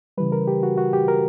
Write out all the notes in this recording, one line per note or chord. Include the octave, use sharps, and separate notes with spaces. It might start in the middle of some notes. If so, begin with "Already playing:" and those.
C#3 E3 G3 B4
A#4
G4
F#4
F#4
G4
A#4